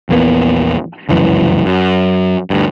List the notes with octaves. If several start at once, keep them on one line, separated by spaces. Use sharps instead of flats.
A#1 E2 A#3 B3
F1 C#2 F#2 E3
F#2
D2 G2